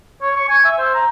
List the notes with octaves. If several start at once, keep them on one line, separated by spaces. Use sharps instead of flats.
C#5
C#6
G#5
E5
C5
A#5